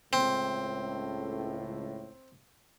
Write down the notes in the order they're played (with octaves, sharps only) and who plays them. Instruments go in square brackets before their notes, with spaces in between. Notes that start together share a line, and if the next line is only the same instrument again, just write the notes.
[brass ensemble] C#2 A2 [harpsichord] C4